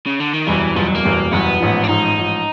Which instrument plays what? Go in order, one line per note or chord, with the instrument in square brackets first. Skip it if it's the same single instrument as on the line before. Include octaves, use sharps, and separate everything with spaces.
[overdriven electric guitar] C#3
D3
D#3
[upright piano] F#1 E2 B2 G3 [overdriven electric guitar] E3
[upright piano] F#1 E2 B2 G3 [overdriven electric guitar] F3
[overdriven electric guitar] F#3
A#3
[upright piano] F#1 E2 B2 G3
[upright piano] F#1 E2 B2 G3 [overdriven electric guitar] B3
[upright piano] A1 G#2 F3
[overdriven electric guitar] D4
[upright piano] A1 G#2 F3 [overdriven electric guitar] D#4
[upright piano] A1 G#2 F3